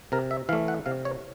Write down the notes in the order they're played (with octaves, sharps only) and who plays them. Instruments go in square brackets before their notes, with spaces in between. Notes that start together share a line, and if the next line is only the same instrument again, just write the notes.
[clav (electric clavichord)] C3 A#4
E5
E3 F5
A3
F#5
C3 F5
C#5